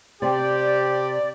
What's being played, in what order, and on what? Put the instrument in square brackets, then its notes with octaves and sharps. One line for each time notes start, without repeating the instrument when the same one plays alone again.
[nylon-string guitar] C3 C4 [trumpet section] G4 [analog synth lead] D5